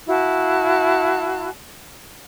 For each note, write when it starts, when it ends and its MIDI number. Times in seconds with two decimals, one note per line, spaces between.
0.08 1.49 64
0.08 1.49 66
0.08 1.49 77
0.08 1.49 81